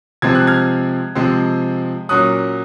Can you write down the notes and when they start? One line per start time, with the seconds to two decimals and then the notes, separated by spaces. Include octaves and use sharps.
0.22 C3 F3 G#3 C4 G#6
0.35 F#6
0.47 F6 G#6
1.15 C3 F3 G#3 C4
2.09 A#2 F#3 C#4 D#6 F#6